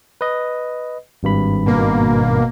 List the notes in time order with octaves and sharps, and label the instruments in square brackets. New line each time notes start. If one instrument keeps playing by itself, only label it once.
[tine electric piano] B4 D#5
G#1 G2 B5
[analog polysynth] B2 A#3